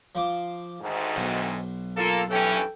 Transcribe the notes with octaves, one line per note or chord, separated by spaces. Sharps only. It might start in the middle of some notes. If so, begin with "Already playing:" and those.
F3 C5 D6
D2 G#2 D#3
B1 C5
A#3 F4 A4
G2 E3 C#4 A4 G5